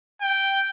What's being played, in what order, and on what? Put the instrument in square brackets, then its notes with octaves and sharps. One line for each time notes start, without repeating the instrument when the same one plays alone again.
[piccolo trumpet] G5